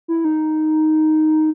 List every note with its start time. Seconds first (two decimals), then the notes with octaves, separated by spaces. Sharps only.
0.08 E4
0.25 D#4